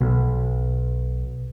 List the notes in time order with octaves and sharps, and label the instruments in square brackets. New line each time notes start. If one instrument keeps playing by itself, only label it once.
[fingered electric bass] B1